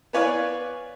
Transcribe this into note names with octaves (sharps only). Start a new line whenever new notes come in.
B3 B4 C#5 D5 F5 G#5